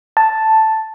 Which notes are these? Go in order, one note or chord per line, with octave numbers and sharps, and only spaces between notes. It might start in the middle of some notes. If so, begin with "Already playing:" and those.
A5